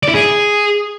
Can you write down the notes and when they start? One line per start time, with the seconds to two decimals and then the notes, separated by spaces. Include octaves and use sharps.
0.03 D5
0.08 E4
0.14 G#4